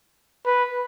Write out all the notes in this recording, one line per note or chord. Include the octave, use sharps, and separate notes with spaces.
B4